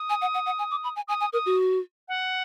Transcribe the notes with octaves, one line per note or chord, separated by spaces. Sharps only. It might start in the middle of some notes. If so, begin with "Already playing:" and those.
Already playing: D#6
G#5
F#5
F#5
F#5
G#5
D6
B5
G#5
G#5 D#6
G#5
A#4 D#6
F#4
F#5